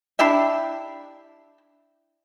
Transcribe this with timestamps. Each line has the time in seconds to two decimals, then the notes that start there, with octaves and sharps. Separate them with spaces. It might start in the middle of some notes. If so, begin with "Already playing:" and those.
0.19 D4 E4 G4 E5